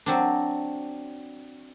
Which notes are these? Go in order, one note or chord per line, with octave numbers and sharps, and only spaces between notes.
F#3 C4 D4